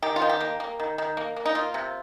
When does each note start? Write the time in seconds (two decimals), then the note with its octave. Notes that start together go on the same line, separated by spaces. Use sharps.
0.02 D#3 G4
0.16 F4
0.22 D#3
0.29 G4
0.40 A#3
0.60 A#3
0.80 D#3
0.98 D#3
1.17 A#3
1.36 A#3
1.46 D#4
1.55 A#3 F4
1.74 C3